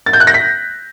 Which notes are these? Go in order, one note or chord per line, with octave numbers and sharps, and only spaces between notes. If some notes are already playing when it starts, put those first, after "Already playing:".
A6
G6
F#6
A#6
B6